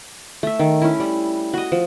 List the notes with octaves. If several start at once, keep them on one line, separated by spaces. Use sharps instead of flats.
A3 E5
D#3
C#4 E4
G3
F#4 D#5
F3